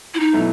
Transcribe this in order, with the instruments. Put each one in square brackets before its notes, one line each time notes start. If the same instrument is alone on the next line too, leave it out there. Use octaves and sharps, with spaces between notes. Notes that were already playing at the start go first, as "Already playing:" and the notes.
[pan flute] E4
D#4
[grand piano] B2 F#3 A3 E4